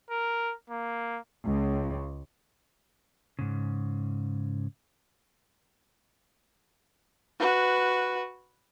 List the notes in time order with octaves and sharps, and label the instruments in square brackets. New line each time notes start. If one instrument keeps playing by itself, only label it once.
[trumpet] A#4
A#3
[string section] C#2
[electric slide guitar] G#2 C#3
[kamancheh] F#4 B4